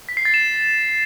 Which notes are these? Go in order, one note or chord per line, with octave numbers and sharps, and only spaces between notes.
B6
C7
A6
E7